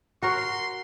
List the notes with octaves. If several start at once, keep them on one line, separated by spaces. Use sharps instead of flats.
F#4 A#4 C#5 C6